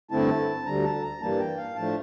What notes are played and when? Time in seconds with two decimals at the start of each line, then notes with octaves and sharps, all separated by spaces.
0.10 G2 D3 A3 C4 E4 A5
0.65 D2 D3 G3 A#5
0.84 A5
1.02 A#5
1.21 G2 E3 G3 A#3 A5
1.39 G5
1.57 F5
1.76 A2 F3 A3 D4 A5